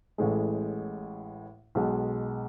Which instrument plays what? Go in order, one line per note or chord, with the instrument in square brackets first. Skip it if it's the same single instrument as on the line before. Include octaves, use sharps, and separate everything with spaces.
[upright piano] A1 A2 G#3
B1 B2 G#3